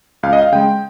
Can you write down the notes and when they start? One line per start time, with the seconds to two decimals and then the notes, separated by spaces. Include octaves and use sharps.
0.23 C#2 F5
0.33 D#5
0.42 F5
0.52 C#3 G#3 G5